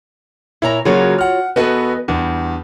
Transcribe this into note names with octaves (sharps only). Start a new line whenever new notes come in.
A#2 E4 C#5 A#5
C#3 F#3 A#3 F4 F#4 C#5
F#5 F6
E2 B3 F#4 A4 B4 D#5
E2 G3 D4